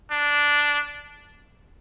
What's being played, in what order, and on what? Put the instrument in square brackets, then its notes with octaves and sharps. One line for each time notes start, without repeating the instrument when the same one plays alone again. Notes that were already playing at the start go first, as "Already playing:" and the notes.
[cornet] D4